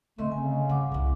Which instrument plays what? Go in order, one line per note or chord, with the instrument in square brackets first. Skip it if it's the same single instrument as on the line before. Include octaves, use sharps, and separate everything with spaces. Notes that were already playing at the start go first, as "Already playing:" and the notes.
[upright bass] D3 [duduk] A3 [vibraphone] C4 D#5 C6
[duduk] C#3 [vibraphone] G#5
[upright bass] G2 [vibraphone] F#5 D6
[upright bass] C2 E3